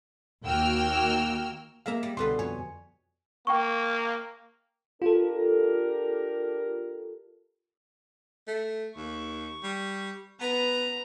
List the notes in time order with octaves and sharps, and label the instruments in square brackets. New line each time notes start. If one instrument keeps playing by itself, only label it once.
[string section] D#2 A#3 F#4 G5 E6 F6
[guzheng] G#3 E5 A#5 [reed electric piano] A#3 F5
[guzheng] G3
[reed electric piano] C2 C6 [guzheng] B2 D3 B4
[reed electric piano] F2 G#5 [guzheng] C#5
[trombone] A#3 [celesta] G5 C#6
[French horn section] D4 G4 A#4 [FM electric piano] F4 A4
[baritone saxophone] A3
[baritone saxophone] D#2 [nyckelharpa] C#6
[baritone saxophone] G3
[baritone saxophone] B3 [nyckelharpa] B4 A#5